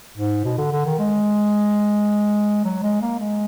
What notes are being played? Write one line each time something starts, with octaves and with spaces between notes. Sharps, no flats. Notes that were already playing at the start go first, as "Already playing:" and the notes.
G#2
B2
D3
D3
D#3
G#3
F#3
G#3
A#3
G#3